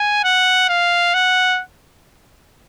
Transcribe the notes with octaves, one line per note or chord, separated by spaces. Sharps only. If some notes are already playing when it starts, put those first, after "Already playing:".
Already playing: G#5
F#5
F5
F#5